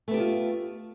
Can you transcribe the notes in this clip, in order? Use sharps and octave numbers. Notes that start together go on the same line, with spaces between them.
A3 B3 D4 F4 G4